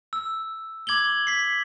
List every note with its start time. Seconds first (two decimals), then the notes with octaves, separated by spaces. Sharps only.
0.13 E6
0.87 D6 G#6 F#7 G7
1.27 B6 C7